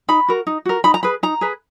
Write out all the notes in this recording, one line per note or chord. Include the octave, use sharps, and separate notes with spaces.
D#4 B5
F#4 A#4
D#4
F#4 A#4
D#4 B5
A#5
G#4 B4 B5
D#4 A#5
G#4 B4